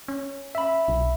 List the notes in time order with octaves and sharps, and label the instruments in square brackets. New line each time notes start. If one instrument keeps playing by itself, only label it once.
[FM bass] C#4
[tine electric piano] E5 B5
[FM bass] B1